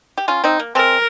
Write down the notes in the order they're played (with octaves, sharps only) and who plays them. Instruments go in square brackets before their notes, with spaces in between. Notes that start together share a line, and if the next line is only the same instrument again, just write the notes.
[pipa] G4
C#4 F4
C4 D#4
A#3
[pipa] G#3 C4 [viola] A#4